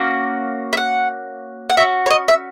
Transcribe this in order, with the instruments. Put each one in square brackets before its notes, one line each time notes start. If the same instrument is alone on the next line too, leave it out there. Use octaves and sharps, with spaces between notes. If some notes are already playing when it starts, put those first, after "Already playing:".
Already playing: [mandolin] A#3 C#4 F#4
E5
F#5
F#5
C#4 F#4 E5
C#5
D#5
E5